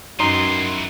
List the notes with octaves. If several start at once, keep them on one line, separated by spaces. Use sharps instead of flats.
F#2 D#3 E3 D#4 C6